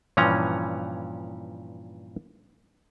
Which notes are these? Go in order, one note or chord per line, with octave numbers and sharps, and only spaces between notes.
G2 A#2 E3 F3 C#4 A#5